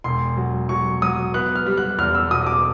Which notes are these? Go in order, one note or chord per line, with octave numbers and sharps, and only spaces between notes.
E1 C6
F#3
F#3 C#6
F#3 D#6
B3 F#6
F6
G3
F#6
E2 F6
E6
B2 D#6
D6